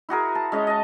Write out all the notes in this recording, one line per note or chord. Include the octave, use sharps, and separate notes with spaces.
E4 F#4 G#4 A#4
A5
G#3 C#4 C#5 D#5
D#5 A5